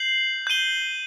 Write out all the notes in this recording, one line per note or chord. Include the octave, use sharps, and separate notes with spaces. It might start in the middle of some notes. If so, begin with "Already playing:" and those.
Already playing: G6 C7 F#7
G6 D#7 G7